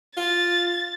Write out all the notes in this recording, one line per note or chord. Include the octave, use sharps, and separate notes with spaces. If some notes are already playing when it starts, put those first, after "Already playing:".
F4 A6